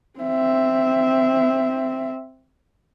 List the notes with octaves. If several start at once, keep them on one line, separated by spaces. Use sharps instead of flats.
C4 E5